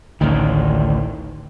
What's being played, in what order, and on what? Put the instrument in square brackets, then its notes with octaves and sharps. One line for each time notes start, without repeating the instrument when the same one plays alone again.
[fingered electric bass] A1 D2 D#3